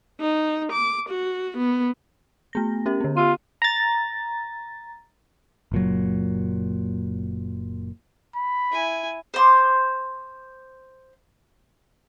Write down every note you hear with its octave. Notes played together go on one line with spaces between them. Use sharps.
D#4
D6
F#4
B3
A3 B3 A#6
C#4 G4 A#4
D3 B3
F4 G4 E6 D#7
A#5 A6
F#1 A#2 F#3
B5
E4 G#5
C5 C6 D6